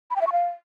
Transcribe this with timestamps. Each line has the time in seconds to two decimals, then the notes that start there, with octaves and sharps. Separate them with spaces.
0.10 B5
0.16 G5
0.21 E5
0.27 C#6
0.32 F5